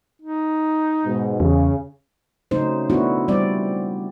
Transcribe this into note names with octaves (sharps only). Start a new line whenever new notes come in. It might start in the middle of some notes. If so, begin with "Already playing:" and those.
D#4
G#2 B2
E2 C#3
C#3 F#3 A3 C4 D#4 C5
A3 B3 D4 E4 F#4
G3 C4 D5